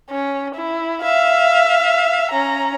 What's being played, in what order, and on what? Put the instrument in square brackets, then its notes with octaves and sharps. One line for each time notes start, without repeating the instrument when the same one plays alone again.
[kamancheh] C#4
E4
E5 F5
C#4 A#5